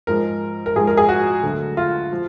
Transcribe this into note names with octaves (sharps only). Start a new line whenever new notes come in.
G#2 F3 G#3 A#4
A#4
G#2 F3 G#3 G#4
A#4
G#4
F#4
D2 D3 F#3
F4
F3